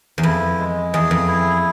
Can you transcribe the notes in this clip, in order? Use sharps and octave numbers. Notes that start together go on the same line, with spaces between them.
E2
F2 E4
G#3
E2 G#4
F2
E4